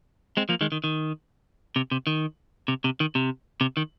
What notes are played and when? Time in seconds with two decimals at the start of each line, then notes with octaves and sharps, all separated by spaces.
0.37 G#3 C4
0.49 F3 A#3
0.61 D#3 G#3
0.72 D#3
0.84 D#3
1.76 C3
1.91 C3
2.07 D#3
2.68 C3
2.84 C3
3.00 D#3
3.15 C3
3.61 C3
3.77 D#3